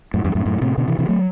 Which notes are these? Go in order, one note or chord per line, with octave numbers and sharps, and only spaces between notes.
F#2 A2
E2 G2
F#2 A2
F#2 A2
A2 C3
B2 D3
C3 E3
C3 E3
F#3 A3